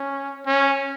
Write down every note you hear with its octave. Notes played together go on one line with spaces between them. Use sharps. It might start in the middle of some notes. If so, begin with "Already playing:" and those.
Already playing: C#4
C#4